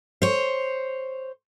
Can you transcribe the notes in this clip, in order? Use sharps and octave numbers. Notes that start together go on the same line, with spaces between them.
C5 C#5